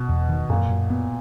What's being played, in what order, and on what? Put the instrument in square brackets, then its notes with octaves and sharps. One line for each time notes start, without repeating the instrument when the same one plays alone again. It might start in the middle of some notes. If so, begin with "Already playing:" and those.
Already playing: [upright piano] B2
[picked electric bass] E2
D#3
[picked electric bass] F#2 [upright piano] A#2
[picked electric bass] F#2
B3